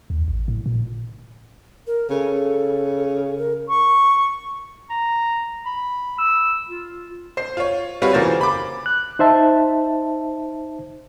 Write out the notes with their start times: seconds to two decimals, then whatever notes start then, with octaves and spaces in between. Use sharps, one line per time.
0.10 D#2
0.28 A1
0.48 A2
0.66 A#2
1.87 A#4
2.10 C#3 A4
3.38 A#4
3.69 C#6
4.90 A#5
5.65 B5
6.18 E6
6.69 F4
7.37 C5 C7
7.57 F4 C#5
8.02 G3 C4 F4 F#4 B4 C#5
8.13 C#3 E3 A#3 C5 A6
8.41 B5 D6
8.86 F#6
9.19 D#4 C5 E5 A5